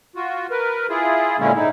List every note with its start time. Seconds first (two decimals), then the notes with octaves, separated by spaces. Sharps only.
0.16 F4 F#4
0.51 A#4 B4
0.89 E4 F4 G#4
1.39 A#2 D3 G#3 A#3 C#4 E4
1.55 G#2 D#4 E4